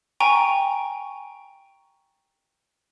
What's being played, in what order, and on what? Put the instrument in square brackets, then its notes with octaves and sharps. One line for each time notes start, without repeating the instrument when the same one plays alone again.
[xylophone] G5 G#5 A#5 C#6